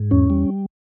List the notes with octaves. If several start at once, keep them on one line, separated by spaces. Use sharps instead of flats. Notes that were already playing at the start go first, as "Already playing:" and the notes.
Already playing: G#2
E2 C#4
G3